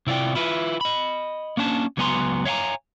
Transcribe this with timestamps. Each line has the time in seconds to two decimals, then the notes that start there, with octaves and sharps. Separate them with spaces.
0.07 C3 E4 F4 D5 G5
0.35 E4 F4 B4
0.81 D#5 B5
1.57 A#3 C#4 D4 A5
1.97 C#2 F#3 B3 G#5 A#5 C6
2.45 C#5 E5 F5 G5 G#5 A#5